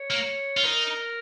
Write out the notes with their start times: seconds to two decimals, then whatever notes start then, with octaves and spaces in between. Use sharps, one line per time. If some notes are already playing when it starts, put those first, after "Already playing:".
Already playing: C#5
0.10 A#3
0.57 F4
0.64 D#4 A#4